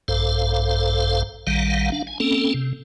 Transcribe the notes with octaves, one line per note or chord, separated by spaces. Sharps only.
A#1 G2 A4 C5 F5
A#1 D#3 G3 F5 F#5
D4 F5
G#5
A#3 C4 C#4 A4
C3